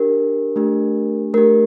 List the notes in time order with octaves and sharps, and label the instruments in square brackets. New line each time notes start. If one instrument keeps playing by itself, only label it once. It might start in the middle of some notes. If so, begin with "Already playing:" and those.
Already playing: [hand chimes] D4 G4 A#4
A3 D4 G4
A3 D4 G4 A#4